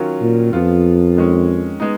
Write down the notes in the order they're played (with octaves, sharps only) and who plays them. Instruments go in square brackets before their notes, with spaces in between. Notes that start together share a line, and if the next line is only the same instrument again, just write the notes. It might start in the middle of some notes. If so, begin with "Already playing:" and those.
Already playing: [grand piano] D#3 F#3 C#4 F4
[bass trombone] A#2
[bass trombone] F2 [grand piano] F3 B3 F4
[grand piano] D#3 G#3 C#4
G#3 B3 D#4